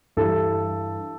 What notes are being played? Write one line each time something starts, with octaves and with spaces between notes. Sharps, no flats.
G2 E3 G3 A4